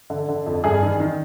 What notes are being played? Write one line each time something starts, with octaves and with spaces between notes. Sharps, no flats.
D3
D3
F2
G2 G#4
D#3
D#3